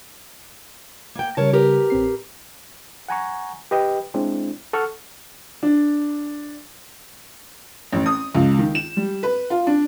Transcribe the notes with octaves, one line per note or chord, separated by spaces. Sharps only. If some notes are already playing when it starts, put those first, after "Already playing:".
A#3 G5
C#3 G3 A#4 C#5 A5
G4 A#4 B4
A1 C4 C7
F#5 G#5 A#5 C#6
G4 B4 D#5 G5
G#3 C4 D4 E4
A4 F#5 C#6 F6
D4
A1
D#6
C#2
D#3
E7
G3
B4
F4
D4